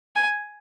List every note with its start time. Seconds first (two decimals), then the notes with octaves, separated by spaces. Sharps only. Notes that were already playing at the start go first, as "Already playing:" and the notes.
0.16 G#5